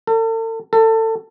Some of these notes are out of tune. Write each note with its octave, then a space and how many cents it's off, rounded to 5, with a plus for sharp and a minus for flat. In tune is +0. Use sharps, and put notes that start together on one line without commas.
A4 +40
A4 +25